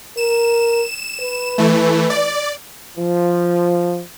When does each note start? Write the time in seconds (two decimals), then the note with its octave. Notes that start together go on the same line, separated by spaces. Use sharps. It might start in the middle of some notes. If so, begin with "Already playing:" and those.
0.17 A#4 E7
1.21 B4
1.58 E3 A3
2.10 D5
2.97 F3